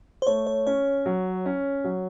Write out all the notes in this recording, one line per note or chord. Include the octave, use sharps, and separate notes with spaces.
C5
A3 C#5
C#5
C#4 C#5
F#3
C#4
F#3